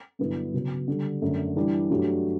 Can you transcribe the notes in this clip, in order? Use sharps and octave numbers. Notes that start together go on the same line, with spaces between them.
G2 D3 F#3 B3 E4
C#3 F#3 B3
D3 G3 D4
F#2 D3 A3
E3 G3 D4 G4
G2 F#3 A3 D4 G4